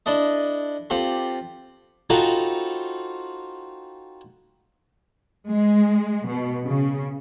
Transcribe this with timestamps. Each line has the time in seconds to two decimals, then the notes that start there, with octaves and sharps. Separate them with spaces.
0.06 D4 E4 A4 D#5
0.90 C4 F4 G4 A4 B5
2.10 C4 D#4 F4 F#4 A4 B5
5.50 G#3
6.28 B2
6.66 C#3